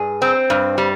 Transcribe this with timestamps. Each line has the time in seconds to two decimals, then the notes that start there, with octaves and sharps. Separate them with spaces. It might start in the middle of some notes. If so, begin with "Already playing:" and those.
Already playing: G2 G#4
0.22 C4
0.50 G2
0.78 G3